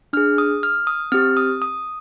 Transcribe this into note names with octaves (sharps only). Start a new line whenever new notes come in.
D4 G#4 F6
D#6
F6
D#6
C4 G4 F6
D#6
D#6